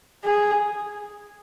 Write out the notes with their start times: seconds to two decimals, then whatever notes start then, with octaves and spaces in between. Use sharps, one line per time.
0.24 G#4